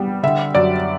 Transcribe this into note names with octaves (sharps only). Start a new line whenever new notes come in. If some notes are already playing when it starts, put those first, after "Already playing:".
Already playing: G3 B3
D3 E5
F#2 D5